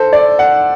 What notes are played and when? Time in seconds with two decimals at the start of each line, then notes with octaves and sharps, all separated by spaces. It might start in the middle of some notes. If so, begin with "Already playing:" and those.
Already playing: A4 C5
0.13 D5
0.39 F#5